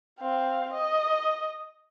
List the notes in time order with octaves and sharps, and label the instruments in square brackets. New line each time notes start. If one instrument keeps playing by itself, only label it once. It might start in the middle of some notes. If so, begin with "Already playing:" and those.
[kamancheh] C4 F5
D#5